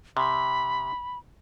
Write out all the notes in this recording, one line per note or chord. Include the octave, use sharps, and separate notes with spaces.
C3 B5